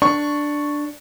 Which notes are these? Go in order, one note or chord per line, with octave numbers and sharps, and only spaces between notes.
D4 C#6